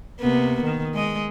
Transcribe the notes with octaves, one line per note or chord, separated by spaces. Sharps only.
C3 A#3 B3
D#3
G#3 D#5